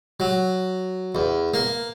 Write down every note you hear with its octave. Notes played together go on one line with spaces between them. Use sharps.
F#3
E2
A#3